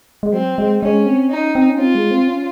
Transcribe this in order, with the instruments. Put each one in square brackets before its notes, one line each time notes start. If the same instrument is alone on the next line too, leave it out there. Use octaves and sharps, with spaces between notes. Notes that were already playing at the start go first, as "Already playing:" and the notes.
[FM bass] G#3
[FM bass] F#3 [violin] C4
[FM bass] G#3
[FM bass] G#3 [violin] C#4
[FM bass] C4
[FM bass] C#4 [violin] D#4
[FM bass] C4
C#4
[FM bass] C4 [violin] F4
[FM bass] G#3
C4
C#4